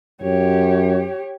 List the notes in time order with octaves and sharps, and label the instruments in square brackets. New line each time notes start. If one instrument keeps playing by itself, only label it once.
[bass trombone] F#2 [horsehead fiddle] G4 C#5